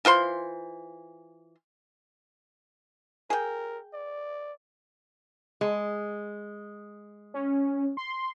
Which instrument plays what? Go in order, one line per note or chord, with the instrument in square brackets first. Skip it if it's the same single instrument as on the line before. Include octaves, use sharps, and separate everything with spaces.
[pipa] E3 F4 C5 C6
[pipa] G#4 G5 [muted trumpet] A#4
[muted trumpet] D5
[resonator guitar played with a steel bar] G#3
[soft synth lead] C#4
C6